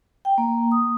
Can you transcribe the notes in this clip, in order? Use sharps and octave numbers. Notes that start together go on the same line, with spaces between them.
G5
A#3
D#6